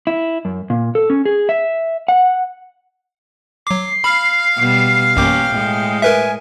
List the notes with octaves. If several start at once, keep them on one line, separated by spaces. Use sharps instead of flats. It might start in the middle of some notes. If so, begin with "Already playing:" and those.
E4
F#2
A#2
A4
C#4
G#4
E5
F#5
F#3 D6 C7
F5 B5
B2 G3
A1 F#2 A#3 C#4 G5 D6
A2 G#3
A#4 B4 E5 G#5